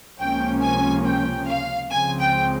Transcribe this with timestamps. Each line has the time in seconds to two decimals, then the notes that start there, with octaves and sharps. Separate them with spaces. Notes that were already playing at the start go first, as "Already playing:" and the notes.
0.19 C#2 C3 F3 A#3 C#4 G5
0.61 G#5
1.04 G5
1.47 F5
1.90 C#2 C#3 F3 C4 G#5
2.19 G5